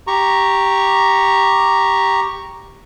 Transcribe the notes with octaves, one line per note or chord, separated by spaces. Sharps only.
G4 A#5 C#6